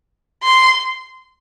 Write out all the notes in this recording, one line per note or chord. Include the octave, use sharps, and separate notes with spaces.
C6